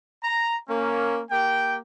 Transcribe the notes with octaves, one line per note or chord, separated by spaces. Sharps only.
A#5
A#3 C#4
A#3 G4 G5